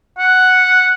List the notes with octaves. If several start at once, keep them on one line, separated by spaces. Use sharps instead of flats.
F#5